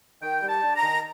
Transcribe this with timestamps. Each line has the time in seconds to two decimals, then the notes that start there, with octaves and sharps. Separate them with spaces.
0.22 D#3 G5
0.42 G3
0.49 A5
0.63 D4
0.76 A#5
0.83 D#3